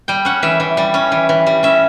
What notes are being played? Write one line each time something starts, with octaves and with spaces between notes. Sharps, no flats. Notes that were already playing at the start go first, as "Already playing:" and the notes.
G3 G5
C#4 F#5
E3 E5
E3
G3
C#4
E3
E3
G3
C#4 E5